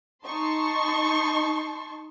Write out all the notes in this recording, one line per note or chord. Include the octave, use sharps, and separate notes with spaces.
D#4 A5 C6 C#6